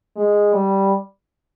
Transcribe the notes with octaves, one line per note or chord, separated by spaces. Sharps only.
G#3
G3